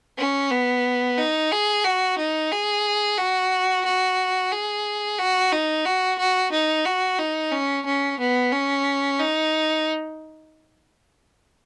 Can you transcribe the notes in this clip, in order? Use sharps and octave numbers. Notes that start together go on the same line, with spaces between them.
C#4
B3
D#4
G#4
F#4
D#4
G#4
F#4
F#4
G#4
F#4
D#4
F#4
F#4
D#4
F#4
D#4
C#4
C#4
B3
C#4
D#4